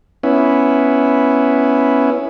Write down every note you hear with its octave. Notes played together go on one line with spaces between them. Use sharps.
B3 C#4 E4